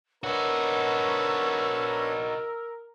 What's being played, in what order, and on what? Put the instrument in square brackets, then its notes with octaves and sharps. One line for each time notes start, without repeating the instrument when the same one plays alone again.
[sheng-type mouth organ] D4 B4 C#5 [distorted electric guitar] D#4 F#4 [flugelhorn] A#4 [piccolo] E6